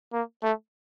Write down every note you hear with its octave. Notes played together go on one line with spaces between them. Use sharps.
A#3
A3